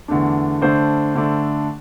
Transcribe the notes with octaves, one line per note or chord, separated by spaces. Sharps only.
E2 D3 A3 D4
D3 A3 D4 C5
D3 A3 D4